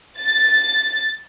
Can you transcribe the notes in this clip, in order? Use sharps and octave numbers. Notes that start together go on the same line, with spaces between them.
A6